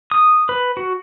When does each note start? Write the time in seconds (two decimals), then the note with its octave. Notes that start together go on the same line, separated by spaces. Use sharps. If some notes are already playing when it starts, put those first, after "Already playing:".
0.11 D#6
0.49 B4
0.77 F#4